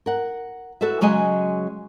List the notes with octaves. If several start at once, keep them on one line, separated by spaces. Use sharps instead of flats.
A#4 F#5
F#4 A4 B4 E5
C#3 F#3 G#3 D#5 G#5